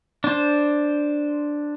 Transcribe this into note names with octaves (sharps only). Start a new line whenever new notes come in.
D4 C5